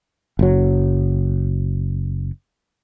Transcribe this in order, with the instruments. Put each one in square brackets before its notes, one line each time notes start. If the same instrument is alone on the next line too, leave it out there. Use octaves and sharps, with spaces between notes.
[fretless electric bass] F#1 F#3